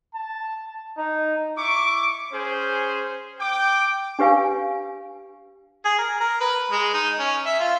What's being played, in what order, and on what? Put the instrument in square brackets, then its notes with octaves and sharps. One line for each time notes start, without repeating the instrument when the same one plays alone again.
[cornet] A5
D#4
[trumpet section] E4 C#6 D6
C#4 G#4 C5
G5 D6
[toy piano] D4 G4 B4 F5 G#5
[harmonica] G#4
A#4
A#4
B4
G#3
D#4
C#4
E5
F4